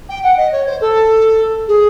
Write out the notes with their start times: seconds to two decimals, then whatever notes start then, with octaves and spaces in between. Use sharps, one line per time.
0.09 G5
0.23 F#5
0.37 D#5
0.52 C#5
0.66 C5
0.81 A4
1.67 G#4